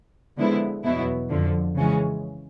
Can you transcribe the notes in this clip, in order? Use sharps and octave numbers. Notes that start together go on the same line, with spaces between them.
D3 F3 G#3 B3 E4
E2 B2 F#3 B3 E4
F2 D3 F3
C#3 E3 G#3 C#4